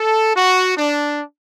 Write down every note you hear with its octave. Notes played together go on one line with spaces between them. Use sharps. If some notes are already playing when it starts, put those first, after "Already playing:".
Already playing: A4
F#4
D4